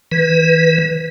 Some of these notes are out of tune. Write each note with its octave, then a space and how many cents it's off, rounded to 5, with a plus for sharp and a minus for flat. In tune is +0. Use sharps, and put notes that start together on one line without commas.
E3 -35 B4 +0